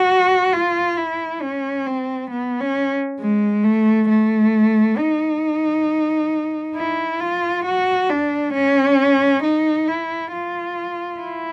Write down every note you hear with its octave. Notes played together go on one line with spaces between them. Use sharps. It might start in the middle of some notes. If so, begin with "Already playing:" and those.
Already playing: F#4
F4
E4
C#4
C4
B3
C#4
G#3
A3
A3
D#4
E4
F4
F#4
D4
C#4
D#4
E4
F4
E4